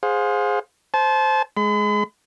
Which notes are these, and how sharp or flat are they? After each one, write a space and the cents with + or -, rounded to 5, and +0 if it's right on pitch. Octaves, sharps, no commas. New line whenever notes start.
G#4 +0 C5 +0 F5 +40
C5 +0 A5 -30
G#3 +15 B5 +45